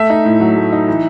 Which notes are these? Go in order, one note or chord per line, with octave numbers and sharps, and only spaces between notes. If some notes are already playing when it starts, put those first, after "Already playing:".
Already playing: A3 E5
D#4
A2
F#3
A3
D#4
E3